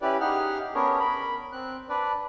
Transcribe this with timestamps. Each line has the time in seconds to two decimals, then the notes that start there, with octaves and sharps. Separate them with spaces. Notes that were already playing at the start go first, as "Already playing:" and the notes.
0.01 C#4 E4 G4 B4 D5
0.21 D#4 G4 G#4 F#5 F6
0.75 B3 C#4 D4 G#4 A#4 C#5
0.99 A#4 B5
1.52 C4 F#6
1.89 D4 B4 D5